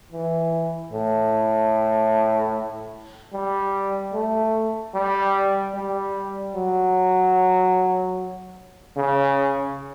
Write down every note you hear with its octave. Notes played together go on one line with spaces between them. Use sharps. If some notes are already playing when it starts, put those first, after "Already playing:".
E3
A2
G3
A3
G3
G3
F#3
C#3